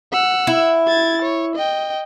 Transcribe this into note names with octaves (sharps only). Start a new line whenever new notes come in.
F#5 E6
E4
G#6 A6
C#5
D#5 G5